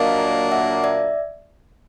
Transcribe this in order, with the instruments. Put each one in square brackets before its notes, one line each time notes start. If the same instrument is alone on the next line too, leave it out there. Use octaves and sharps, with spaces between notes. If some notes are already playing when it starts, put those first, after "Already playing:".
Already playing: [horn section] A#2 F#3 A#3 D4 [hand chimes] D#5 F5
[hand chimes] E5 F#5
D5 E5